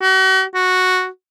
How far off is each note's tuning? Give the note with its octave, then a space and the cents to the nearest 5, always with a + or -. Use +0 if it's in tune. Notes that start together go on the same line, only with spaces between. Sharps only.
F#4 +40
F#4 -5